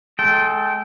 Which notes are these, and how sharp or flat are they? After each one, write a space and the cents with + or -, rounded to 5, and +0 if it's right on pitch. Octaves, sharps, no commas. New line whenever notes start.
G#3 +20 A4 +0 G5 -20